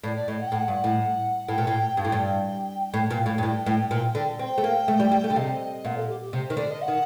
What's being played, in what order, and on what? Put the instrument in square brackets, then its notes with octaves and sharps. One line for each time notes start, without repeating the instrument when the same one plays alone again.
[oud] A2 [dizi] D5
[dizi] D5
[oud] A2 [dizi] D#5
[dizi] F#5
G5
[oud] A2 [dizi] F#5
[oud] G2
A2
[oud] A2 [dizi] G5
[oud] A#2
A2
[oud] G2 [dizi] G5
[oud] A2
G2
A2
A#2
A2
G2
[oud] A2 [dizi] G5
[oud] A2
A#2
D3
[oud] C4 [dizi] G5
[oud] A3
A#3
A3
G3
G3
A3
D3
[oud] C3 [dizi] D#5
[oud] A#2 [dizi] F#5
[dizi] A4
G4
G4
[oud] C3
D#3
[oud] D3 [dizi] D5
[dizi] D#5
F#5
[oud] D#3